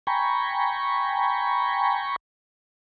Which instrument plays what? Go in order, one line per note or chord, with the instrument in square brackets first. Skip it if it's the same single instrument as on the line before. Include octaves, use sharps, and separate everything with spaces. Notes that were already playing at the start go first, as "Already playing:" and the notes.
[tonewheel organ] G5 G#5 A#5 B5 C#6